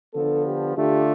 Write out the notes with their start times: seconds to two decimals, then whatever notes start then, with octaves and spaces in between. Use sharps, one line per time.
0.14 D3 F3 B3 D4 A4
0.44 G4
0.76 D3 A3 D4 F4 G4